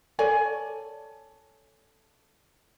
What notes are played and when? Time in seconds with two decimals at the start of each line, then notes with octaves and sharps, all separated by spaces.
0.19 A4 C#5 D5 G#5